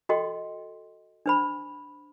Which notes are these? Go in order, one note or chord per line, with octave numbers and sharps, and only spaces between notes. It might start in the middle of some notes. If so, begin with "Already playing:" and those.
F#4 A4 D#5 G5 C6
D4 C5 B5